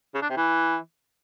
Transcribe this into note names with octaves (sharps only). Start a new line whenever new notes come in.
C#3
D4
C3
E3